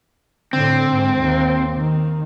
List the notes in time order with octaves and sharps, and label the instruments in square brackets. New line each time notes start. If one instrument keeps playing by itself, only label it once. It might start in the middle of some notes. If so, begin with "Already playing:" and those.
[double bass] A2 D3 [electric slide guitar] C4
[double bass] G#2
D#2
D#3